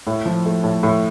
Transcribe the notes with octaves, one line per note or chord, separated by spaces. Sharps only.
A2
F3
A3
A2
A2